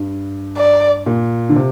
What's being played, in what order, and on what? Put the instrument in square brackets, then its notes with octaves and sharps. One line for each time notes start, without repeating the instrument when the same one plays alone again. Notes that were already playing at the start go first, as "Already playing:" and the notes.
Already playing: [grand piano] G2
[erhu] D5
[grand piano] A#2
D3
C3